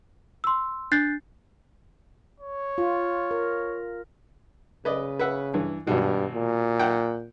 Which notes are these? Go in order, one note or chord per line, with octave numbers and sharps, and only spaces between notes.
C6 E6
D4 F#6 G6 A6 C7
C#5
F4
A#4
C#3 B4 D5 D#5
B4 E5 F#5
G2 E3
G#1 G2 B2
A#2
F#5 G5